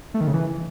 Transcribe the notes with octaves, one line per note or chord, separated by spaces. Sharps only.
A3
D#3
C#3
E3